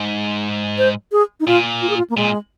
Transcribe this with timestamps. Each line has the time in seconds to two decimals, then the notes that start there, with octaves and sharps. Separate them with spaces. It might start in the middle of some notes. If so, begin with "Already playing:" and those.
Already playing: G#2
0.78 C5
1.12 G#4
1.40 D#4
1.47 A#2 F4
1.82 F4
1.90 G#4
1.97 F4
2.10 A#3
2.17 A#2 G#3